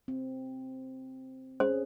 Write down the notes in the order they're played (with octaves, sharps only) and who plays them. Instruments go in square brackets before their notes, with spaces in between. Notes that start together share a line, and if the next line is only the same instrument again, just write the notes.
[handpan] C4
[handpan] C#4 G#4 [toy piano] C5